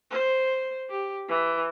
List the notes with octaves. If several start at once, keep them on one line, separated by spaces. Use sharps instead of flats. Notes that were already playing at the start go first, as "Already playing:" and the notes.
C5
G4
E3